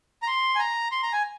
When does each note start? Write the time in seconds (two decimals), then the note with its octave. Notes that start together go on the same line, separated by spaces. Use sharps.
0.22 A#5
0.27 C6
0.55 G#5
0.59 A#5
0.92 C6
1.03 A#5
1.13 G#5